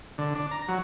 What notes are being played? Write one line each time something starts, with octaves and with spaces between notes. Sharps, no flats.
D3
D4
A#5
F#3